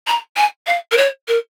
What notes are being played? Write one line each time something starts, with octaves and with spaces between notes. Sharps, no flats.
A#5
G#5
F5
A#4
C#5
A#4